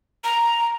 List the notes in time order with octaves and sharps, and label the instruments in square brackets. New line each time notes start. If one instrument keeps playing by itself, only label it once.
[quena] A#5